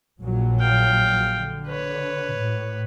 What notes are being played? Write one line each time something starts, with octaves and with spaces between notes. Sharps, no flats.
A#1 A#2 F#3
F5 G5
D3
B4 C#5
A2